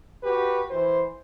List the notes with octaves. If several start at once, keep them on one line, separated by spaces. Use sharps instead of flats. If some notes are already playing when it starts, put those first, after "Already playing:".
F#4 G4 B4
E3 C5